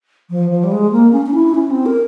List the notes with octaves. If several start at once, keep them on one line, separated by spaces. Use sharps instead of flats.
F3
F3
G3
G#3
A#3
C#4
C#4
E4
C#4
C4
A#4